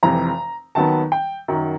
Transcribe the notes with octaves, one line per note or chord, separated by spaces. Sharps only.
F1 F2 C3 E3 A#5
D#2 D#3 F#3 B3 A5
G5
F#2 D#3 F#3